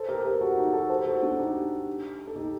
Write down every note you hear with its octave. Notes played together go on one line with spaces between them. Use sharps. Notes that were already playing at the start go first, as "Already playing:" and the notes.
Already playing: A4 C5
G4 A#4
G4 A#4
F#4 A4
D#4 G4
F#4 A4
A4 C5
F#4 A4
D4 F#4
D#4 G4
A4
D#4 G4